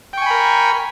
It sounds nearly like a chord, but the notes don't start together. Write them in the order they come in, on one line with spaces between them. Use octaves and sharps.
G5 C#6 G#5 B5 A#4